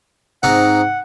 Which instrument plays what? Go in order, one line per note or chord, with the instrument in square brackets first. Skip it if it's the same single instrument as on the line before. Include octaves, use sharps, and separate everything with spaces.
[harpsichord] G#2 C4 D#4 [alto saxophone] F#5